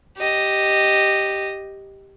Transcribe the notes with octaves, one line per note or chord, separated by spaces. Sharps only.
G4 D#5